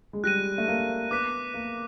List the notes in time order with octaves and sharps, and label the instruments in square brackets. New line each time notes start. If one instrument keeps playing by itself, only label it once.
[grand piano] G#3
[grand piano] G3 [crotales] F#6 A#6 D#7
[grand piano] A3
A#3
[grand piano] B3 [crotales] D6 F#6 B6 D#7
[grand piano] A#3